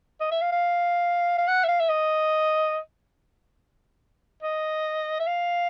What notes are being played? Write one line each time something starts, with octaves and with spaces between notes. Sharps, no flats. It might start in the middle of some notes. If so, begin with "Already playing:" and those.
D#5
E5
F5
F5
F5
F#5
E5
F5
E5
D#5
D#5
E5
F5